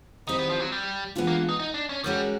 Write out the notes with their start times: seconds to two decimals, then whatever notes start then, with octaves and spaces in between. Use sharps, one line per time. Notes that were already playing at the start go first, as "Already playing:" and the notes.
0.27 D#3 G3 C4 D#4 E4
0.39 B3
0.50 F3
0.60 F#3
0.72 G3
1.16 E3 G#3 B3 D4 F4
1.27 A#3
1.49 D#4
1.59 D#4
1.74 D4
1.89 C#4
2.04 G3 G#3 C#4 F#4 A#4